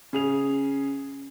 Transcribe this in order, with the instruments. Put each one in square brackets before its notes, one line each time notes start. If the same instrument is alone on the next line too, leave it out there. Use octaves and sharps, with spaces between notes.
[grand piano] C#3 G#4 F7